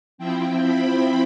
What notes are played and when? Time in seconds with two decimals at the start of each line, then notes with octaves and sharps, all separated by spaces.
0.18 F3 C4 E4 G5
0.62 B5